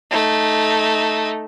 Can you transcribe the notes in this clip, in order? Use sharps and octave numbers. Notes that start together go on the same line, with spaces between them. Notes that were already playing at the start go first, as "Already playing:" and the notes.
A3 D#4